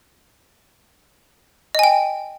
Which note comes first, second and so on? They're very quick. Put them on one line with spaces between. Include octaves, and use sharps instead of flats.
D#5 G#5 G5